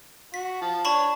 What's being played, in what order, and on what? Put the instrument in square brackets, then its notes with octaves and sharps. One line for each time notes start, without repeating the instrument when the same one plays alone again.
[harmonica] F#4 [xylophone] B6
[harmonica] F3 A5
[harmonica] D4 C#5 [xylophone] A5 B5 C#6